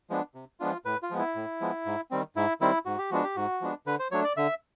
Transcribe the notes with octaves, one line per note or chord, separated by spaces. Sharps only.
F3 G#3 B3 D4
C3
F3 G#3 B3 D4 F4
A2 B4
F4
F3 G#3 B3
E4
A2
F3 G#3 B3
G#2
D#3 G3 C4
G#2 E4
D#3 G3 C4 E4
G#2 F#4
G4
F3 G#3 B3 D4 F#4
G4
G#2 F#4
F3 G#3 B3 D4
D3 B4
C5
F#3 A3 D4 C#5
D5
D3 E5